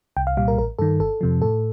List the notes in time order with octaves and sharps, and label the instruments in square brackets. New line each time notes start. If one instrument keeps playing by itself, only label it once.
[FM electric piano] C2 G5
F5
A#2 G3 F5
A#4
A1 A#4
G2 D#3 A4
G1 A4
F2 C3 F3
A2 A4